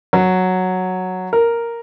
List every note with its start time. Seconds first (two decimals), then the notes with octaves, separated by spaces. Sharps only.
0.13 F#3
1.33 A#4